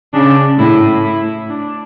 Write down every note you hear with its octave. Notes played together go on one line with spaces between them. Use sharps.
C#3 D4
A2 E4
E4
D4